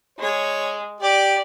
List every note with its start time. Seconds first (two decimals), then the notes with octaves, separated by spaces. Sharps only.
0.19 G#3 C#5
1.01 G4 D5